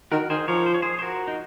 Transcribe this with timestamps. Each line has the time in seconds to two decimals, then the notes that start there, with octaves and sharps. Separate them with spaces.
0.12 D#3 F#4 A#4
0.30 D#3 G#4 C5
0.48 F3 A#4 C#5
0.66 C5
0.74 C#5
0.82 G#4 C5
0.99 C5
1.02 F#4 A#4
1.28 D#4